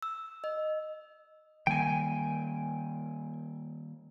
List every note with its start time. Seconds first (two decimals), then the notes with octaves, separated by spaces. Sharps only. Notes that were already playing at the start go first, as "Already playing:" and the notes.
0.02 E6
0.44 D#5
1.67 D#3 G3 A#3 G5 G#5